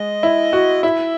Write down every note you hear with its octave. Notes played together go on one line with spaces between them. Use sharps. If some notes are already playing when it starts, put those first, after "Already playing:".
Already playing: G#3 D#5
E4
F#4
E4 E5